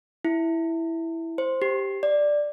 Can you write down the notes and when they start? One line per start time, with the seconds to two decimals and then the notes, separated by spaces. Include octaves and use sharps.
0.25 E4
1.38 C5
1.62 G4
2.03 D5